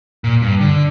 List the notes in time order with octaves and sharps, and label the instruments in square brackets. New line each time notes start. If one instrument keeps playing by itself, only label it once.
[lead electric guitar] A#2
G2
D3